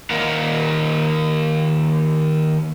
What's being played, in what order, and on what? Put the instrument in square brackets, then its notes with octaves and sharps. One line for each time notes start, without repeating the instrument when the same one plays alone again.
[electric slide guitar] D#3 A#3 A#4 D#5 F5 F#5